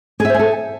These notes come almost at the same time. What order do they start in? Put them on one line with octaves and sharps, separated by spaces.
G#4 E5 C5 G#5 A4